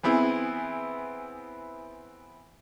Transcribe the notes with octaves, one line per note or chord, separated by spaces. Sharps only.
E3 B3 C4 E4 G#4